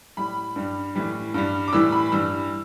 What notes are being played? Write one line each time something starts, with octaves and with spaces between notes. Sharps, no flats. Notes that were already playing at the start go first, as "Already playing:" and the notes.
A2 G3 B5
G2 G3
A2 E3 G3
G2 G3
D6
A2 E3 G3 E6
B5
G2 E3 G3 E6